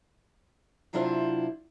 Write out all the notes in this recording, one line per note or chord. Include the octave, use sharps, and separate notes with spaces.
C3 F#3 D4 E4 F4 C5